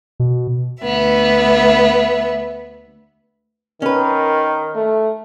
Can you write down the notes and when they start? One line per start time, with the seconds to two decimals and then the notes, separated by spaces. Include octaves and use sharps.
0.20 B2
0.82 D2 B3 E5
3.82 D#3 C#4 A#4 B4
4.75 A3